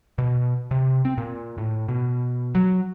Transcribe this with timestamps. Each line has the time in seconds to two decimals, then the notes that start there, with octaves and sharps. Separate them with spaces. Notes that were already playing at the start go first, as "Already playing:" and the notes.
0.18 B2
0.71 C3
1.05 C4
1.18 A#2
1.58 A2
1.89 B2
2.55 F#3